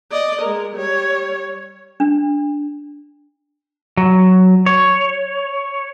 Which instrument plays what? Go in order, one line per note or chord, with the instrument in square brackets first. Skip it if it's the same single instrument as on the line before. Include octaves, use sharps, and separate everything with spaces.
[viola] D5 D#5
G#3 A#4
G3 C#5
[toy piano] D4
[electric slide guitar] F#3
C#5